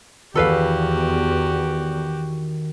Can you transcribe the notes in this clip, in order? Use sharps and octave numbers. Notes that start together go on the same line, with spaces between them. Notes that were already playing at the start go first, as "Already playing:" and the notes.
E2 D#3 F#4 G4 A4 B4 F5